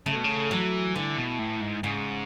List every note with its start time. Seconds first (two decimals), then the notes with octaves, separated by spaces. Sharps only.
0.06 C#3 A3
0.16 B2
0.24 C#3
0.50 E3 F#3
0.95 D3 E3
1.17 B2
1.39 A2
1.61 G#2
1.83 G#2 C#3